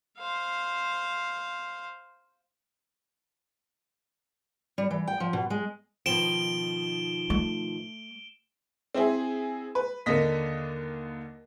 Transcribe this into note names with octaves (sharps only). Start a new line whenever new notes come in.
C5 F5
G3
E3
G5
F3
B2
G#3
B2 D#3 F3 D7 E7 G7
A3
C4 E4 G#4
B4
D#2 D3 A#3 D#5 B6